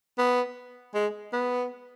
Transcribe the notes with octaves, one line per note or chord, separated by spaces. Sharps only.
B3
G#3
B3